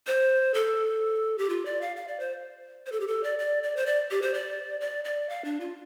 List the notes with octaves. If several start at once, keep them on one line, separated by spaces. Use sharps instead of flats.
C5
A4
G4
F4
D5
F5
F5
D5
C5
C5
A4
G4
A4
D5
D5
D5
C5
D5
G4
C5
D5
D5
D5
F5
D4
F4